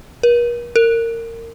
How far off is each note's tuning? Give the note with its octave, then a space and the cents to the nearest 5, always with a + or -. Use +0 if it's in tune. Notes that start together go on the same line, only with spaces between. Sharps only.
A#4 +45
A#4 -25